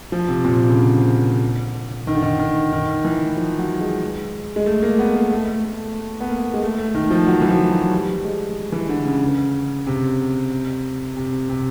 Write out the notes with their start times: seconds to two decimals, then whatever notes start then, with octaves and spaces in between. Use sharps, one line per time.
0.12 F3
0.28 C3
0.45 A#2
0.69 C#3
0.78 D3
2.07 D#3
2.15 D3
2.22 D#3
2.39 D#3
2.72 D#3
3.05 E3
3.36 F3
3.58 F#3
3.80 G#3
4.56 G#3
4.66 A3
4.82 A#3
4.99 B3
5.16 A#3
5.32 A3
5.64 A3
6.20 B3
6.29 A#3
6.54 G#3
6.62 A3
6.79 A3
6.95 D#3
7.11 F3
7.27 F#3
7.42 E3
7.49 F3
7.70 F#3
7.91 G3
8.24 G#3
8.72 E3
8.89 D3
9.06 C#3
9.87 C3
11.16 C3
11.49 C3